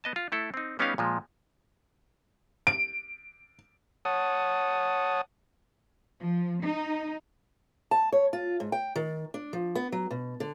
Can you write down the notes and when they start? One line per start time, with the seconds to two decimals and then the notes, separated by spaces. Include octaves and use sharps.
0.04 B3 D#5 A5
0.16 F4
0.32 A3 E4 A4
0.54 C4 D#4
0.79 G3 B3 C#4 D#4 G4 F5
0.98 A#2 F3 G#3
2.67 D7
4.05 C#5 F#5 A5 D#6
6.20 F3
6.64 D#4
7.91 A5
8.12 C#5
8.33 F4
8.60 G#2
8.72 G5
8.96 D#3
9.34 D4
9.53 F3
9.75 B3
9.92 F#3
10.11 B2
10.40 D3